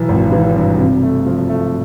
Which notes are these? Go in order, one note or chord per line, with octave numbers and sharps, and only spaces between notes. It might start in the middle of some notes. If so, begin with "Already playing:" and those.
Already playing: B1 E3
G#1
E3
G2
C3
A3
F3
A3